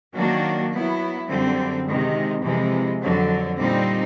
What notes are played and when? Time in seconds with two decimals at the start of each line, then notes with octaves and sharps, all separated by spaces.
0.15 D#3 F#3 A#3 D4 F#4
0.72 F#3 B3 E4
1.29 F#2 D3 G3 C4
1.86 C3 D#3 G#3
2.43 F2 C3 E3 G#3
3.00 F2 D3 F#3
3.58 A#2 G3 C4 D#4